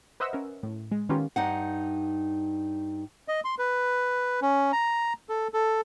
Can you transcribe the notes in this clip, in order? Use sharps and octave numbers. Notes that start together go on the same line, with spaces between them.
B4 C5 D#5 E5 F#5 E6
C#4 A#4
A2
G#3
D#3 B3 C#4 F4 G4 A#4
G2 D#4 F#5
D#5
C6
B4
C#4
A#5
A4
A4